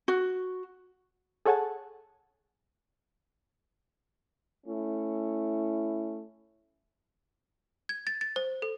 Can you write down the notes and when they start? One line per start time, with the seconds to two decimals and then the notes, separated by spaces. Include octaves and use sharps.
0.08 F#4
1.46 G#4 A4 C#5 F#5 G#5 A5
4.67 A3 C#4 E4
7.89 G#6
8.07 A6
8.21 A6
8.36 C5
8.62 A4